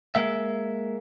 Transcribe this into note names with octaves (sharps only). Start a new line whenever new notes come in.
G#3 A#3 E5